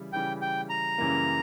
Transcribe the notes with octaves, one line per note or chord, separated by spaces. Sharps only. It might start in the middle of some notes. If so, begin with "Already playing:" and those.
Already playing: C#3 E3 G3
C#3 E3 G3 G5
G5
A#5
F#2 C#3 E3 G3 A#3